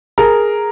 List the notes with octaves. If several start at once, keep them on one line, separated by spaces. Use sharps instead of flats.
G#4 A#4